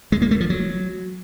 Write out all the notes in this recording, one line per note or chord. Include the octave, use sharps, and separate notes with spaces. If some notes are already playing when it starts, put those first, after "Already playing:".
G#3
A#3
A3
F3
F#3